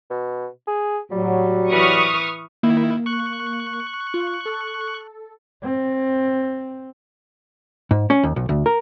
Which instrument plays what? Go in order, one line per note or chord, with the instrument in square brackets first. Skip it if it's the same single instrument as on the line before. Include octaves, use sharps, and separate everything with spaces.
[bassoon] B2
G#4
[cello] A2 [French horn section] F#3 [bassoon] G3
[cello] E3 B4 [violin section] C#6 D#6 F6
[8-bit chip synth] D#3 E4 [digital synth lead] A#3
[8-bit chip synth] C#6 F#6
[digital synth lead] F4
A4
[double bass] C4
[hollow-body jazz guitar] G#2
C#4
D#2
B1
D2
A#4